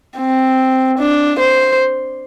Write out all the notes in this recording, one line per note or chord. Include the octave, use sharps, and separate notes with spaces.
C4
D4
C5